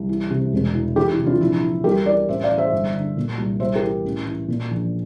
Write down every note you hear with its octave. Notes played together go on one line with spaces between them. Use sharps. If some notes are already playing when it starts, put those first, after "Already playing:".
Already playing: C2
E3
C3
E1
E3
E3 E4 G4
E4
C3
D4 F4
A#1 E4
E3
C2 G4 A#4
E3 A#4 D5
A1 C5 E5
D5 F5
E3
C5 E5
G1
D3
A#2
C2
C2 C5 E5
G4 A#4
E3
A1
E3
A#2
A#1